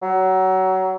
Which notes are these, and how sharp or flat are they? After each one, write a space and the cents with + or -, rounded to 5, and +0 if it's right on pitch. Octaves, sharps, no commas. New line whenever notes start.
F#3 +25